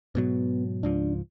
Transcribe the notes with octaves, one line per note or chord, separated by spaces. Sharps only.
G#2 B2 F#3 B3
C#2 G#2 F3 D4